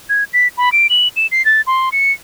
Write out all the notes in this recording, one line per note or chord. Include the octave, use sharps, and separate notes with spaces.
G#6
B6
B5
D7
F#7
E7
C7
A6
C6
C#7